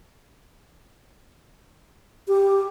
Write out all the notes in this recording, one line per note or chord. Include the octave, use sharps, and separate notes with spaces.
G4